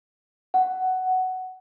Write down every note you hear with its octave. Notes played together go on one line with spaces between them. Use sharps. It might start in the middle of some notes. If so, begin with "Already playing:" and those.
F#5